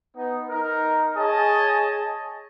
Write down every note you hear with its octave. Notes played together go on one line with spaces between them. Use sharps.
B3 D#4
D#4 A#4
G#4 C#5 D#5 G#5 A5